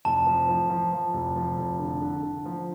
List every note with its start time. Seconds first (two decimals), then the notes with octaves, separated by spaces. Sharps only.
0.05 F1 A5
0.27 F3
0.48 F3
0.70 F3
0.92 F3
1.13 F1
1.36 F3
1.57 F1
1.79 D3
2.01 D3
2.23 D3
2.46 F3